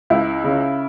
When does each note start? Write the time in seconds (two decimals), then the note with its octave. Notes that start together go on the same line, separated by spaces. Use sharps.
0.10 C#2 E4
0.44 C#3